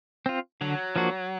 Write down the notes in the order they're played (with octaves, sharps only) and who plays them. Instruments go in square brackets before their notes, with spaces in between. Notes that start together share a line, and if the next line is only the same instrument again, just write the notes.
[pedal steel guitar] C4 F4
[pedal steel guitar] D3 [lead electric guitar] F#3
[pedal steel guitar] F3 A#3 D4 F#4